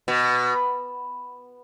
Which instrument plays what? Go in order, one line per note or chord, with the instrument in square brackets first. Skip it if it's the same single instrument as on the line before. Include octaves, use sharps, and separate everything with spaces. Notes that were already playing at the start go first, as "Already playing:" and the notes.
[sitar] B2